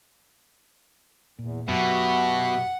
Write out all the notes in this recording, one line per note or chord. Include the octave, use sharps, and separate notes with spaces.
E2 A#2
F#2 B2 F#4 G4 E5 F#5